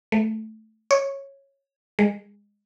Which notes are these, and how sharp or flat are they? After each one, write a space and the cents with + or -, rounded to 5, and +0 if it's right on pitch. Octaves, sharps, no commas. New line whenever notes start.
A3 -5
C#5 -10
G#3 -25